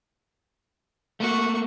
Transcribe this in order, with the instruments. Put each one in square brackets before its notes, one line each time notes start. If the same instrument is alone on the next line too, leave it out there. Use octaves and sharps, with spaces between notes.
[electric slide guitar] A3 A#3 [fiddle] F#4 C#6